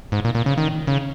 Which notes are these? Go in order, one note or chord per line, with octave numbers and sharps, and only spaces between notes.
G#2
A#2
A#2
C#3
D#3
C#3